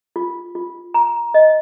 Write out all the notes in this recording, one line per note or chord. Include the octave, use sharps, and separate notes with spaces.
F4
F4
A#5
D#5